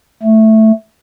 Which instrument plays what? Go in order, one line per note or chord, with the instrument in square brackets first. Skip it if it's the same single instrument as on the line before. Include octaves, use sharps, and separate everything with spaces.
[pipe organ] A3